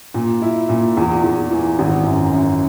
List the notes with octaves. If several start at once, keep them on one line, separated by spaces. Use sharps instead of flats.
A#2
E4
A#2
E2
E2
E3
G#1
F#2
F#2